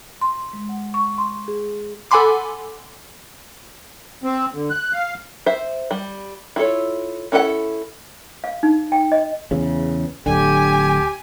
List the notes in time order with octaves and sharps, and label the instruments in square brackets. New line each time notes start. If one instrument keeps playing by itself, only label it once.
[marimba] C6
G#3
F#5
C#6
C6
G#4
[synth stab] A4 F#5 G#5 B5 C6 D6
[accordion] C4
D3
F#6
F5
[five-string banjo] C5 E5
G3
E4 F4 A4 C#5
C#4 E4 A4 C5 F#5
[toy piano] F5
D#4
G5
D#5
[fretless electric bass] E2 C#3
[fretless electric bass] D1 D3 [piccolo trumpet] G4 [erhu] G#5